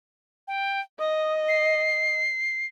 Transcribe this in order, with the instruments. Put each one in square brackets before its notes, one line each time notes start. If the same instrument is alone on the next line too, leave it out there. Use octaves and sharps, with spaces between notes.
[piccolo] G5
[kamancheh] D#5 [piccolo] D#6
[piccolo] C7